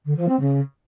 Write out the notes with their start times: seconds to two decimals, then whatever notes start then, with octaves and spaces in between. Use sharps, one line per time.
0.05 D3
0.17 F3
0.28 C4
0.40 C#3